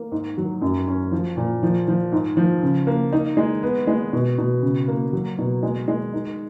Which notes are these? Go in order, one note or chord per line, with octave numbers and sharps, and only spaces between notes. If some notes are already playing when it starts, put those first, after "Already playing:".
Already playing: A#3
G#2
F#3
F#2
C#4
F3
A#2
F3
F3
G#2
F3
C#3
A#3
D#4
G#3
B3
G#3
B2
B2
C#3
A#3
F#3
B2
G#3
G#3
D#4